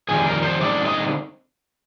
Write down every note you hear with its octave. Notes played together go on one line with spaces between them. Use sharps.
F2 D#3 G3 G#4
A#4
C5
D3 G3 C4 D#4 D5
D#5